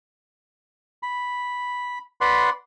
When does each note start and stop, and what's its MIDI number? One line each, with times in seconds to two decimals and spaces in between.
1.03 1.99 83
2.21 2.50 71
2.21 2.50 74
2.21 2.50 78
2.21 2.50 83
2.21 2.50 84